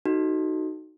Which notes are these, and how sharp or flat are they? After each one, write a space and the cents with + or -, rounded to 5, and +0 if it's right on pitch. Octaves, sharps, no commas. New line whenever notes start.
D#4 +0 F#4 +10 A4 +0